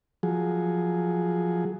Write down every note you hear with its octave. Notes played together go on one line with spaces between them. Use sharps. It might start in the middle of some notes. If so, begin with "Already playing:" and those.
F3 F#3 G#4